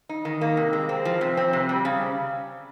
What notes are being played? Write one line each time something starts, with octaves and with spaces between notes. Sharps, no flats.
D#4
D#3
A#3
C3
G#3
C4
F3
C3
C4
C3
G3
C#3